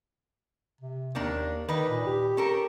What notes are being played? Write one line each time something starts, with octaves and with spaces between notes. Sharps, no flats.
C3
D#2 D#3 A#3 D4
D#3 D4 D#4 B4
A#2
G4
C#4 A4 A#4